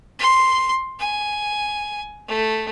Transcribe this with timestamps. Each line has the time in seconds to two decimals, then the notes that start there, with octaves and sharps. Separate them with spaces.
0.19 C6
0.99 G#5
2.28 A3